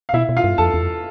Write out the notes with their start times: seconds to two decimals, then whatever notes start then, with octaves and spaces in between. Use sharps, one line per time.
0.09 F5
0.14 B2 E4 E5
0.29 B2
0.37 F4 F5
0.44 G2
0.58 F2 A4 A5
0.74 E2
0.83 F2